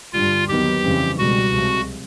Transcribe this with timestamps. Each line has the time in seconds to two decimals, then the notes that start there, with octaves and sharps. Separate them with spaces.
0.13 G2 D3 G3 F4
0.48 D#2 D#3 F#3 B3 G4
0.83 F2 C#3 E3 G3 C4
1.18 C#2 B2 G3 F#4
1.53 C2 C3 F3 G#3